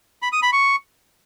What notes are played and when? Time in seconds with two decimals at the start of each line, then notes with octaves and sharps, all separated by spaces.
0.22 B5
0.32 D#6
0.42 B5
0.53 C#6